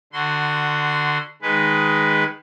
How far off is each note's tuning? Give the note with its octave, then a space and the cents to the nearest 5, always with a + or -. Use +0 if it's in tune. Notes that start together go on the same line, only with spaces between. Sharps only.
D3 +25 F#4 +0 C6 -20
D#3 +0 G#3 +0 B4 +0